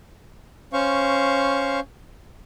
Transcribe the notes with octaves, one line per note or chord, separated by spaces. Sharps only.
C#4 C5 F5 C#6